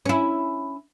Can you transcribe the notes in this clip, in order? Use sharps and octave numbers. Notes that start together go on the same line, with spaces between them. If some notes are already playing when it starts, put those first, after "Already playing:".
C#4 E4